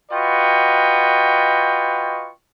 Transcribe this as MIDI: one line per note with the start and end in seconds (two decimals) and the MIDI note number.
0.12 2.31 65
0.12 2.31 66
0.12 2.31 71
0.12 2.31 75
0.12 2.31 79
0.12 2.31 85